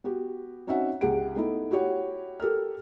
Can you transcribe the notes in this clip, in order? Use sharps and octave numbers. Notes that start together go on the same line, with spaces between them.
B3 F#4 G4
C4 C#4 D#4 F#4 E5 F#5
C#2 G4 G#4 F#5 D7
A3 B3 D#4 E4
E4 F#4 G4 C#5 F#5
G4 A4 A#4 F6